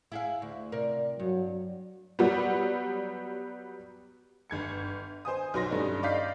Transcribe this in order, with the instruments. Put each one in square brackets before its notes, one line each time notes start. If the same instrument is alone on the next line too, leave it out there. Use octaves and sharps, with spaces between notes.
[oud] E4 G#4 F5
D2
C3 A#4 D5
[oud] G2 [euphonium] F#3
[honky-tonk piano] F#3 G3 B3
G1 G#6 C#7
C5 G#5 D#6
B1 F#3 C6 A#6
G2 A3 C#4 D#4
D5 D#5 F5 G6 B6 C7